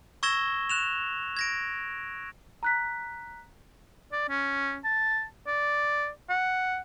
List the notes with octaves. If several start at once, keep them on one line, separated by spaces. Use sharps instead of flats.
C#6 E6 G#6 A#6 E7 G7
F#6 E7 F7
G#6 A#6 D7
A#5 F#6 B6
D5
C#4
A5
D5
F#5